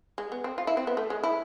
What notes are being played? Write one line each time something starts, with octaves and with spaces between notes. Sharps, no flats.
G#3
B3
C4
F4
E4
C4
B3
A3
G#3
E4